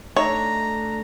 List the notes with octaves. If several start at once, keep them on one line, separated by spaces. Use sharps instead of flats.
A3 D4 D#4 C#5 E5 A#5